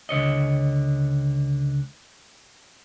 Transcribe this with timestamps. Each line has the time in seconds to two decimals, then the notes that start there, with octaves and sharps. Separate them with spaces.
0.09 C#2 D3 C#5 D#5